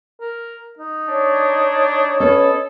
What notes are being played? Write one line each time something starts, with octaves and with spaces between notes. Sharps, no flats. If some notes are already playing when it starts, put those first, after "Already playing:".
A#4
D#4
D4 C#5
C#4 A4 B4 D#5